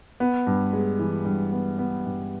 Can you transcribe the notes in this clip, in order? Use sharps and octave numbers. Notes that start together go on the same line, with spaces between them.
B3
G2
G#3
E3
G2
B3
B3
G2